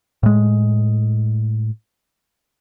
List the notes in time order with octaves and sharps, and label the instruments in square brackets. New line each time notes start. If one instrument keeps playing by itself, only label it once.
[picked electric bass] A2 G#3